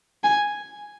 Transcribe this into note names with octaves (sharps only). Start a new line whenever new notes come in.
G#5